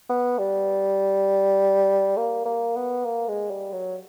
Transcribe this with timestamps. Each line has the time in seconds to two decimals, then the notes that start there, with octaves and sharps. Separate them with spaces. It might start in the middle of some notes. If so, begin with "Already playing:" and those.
0.10 B3
0.39 G3
2.17 A#3
2.46 A#3
2.76 B3
3.05 A#3
3.28 G#3
3.50 G3
3.73 F#3